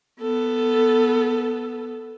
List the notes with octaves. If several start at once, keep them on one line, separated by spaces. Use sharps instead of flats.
B3 A4